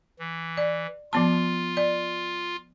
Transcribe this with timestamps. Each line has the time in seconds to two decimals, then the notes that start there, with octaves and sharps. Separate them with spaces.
0.19 E3
0.57 D5
1.13 F3 B3 F4 A5
1.77 D5